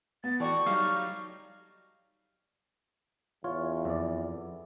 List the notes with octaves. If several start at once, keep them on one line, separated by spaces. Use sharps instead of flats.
B3 A6
E3 F#4 A4 D5 G5 C#6
F#3 G3 D#4 F5
E2 F4 C#5
F2 D5